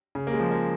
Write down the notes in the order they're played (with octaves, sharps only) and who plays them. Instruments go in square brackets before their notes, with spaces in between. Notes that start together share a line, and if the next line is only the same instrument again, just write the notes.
[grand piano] C#3
A#3
G#3
F3
A#3